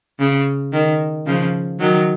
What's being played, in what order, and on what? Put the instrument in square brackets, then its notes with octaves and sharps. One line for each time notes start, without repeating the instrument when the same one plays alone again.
[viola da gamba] C#3
D#3
C#3 F3
D#3 F#3